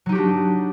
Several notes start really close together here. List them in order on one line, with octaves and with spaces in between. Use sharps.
F#3 D#4 G4 F#4 D4